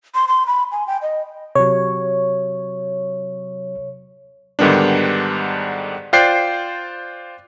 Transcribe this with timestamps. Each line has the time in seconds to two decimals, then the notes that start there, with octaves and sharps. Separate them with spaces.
0.14 C6
0.28 C6
0.47 B5
0.72 G#5
0.87 G5
1.02 D#5
1.55 C3 F#3 C#5
4.59 G#2 D3 D#3 G3 B3 D4
6.13 F4 C5 D5 G5 F#6 C7